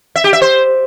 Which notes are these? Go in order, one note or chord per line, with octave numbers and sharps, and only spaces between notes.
E5
G4
E5
C5